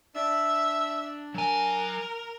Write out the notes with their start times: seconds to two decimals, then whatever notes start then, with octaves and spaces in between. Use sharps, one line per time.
0.15 D4 E5
1.34 F#3 A#4 G#5